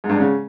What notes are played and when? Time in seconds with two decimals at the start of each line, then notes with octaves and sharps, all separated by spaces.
0.04 G#2
0.09 G2
0.15 G#2
0.20 C#3